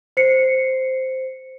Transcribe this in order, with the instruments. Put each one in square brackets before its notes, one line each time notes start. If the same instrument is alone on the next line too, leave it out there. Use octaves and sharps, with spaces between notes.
[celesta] C5 C7 C#7